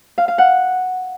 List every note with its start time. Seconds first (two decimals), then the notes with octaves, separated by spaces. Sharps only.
0.18 F5
0.28 F5
0.38 F#5